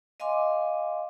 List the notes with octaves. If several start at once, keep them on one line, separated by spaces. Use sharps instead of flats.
D#5 F5 G#5 C6 D6